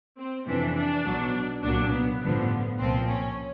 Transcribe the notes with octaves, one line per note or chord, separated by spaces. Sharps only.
C4
F2 C3 E3 D4
D4
B1 B2 F#3
C2 A#2 F#3 D4
B3
A1 G2 D3 F3 B3
C2 A#2 F3 C4
C#4